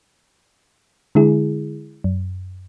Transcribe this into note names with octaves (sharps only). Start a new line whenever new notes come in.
D3 G#3 E4 G#4
F#2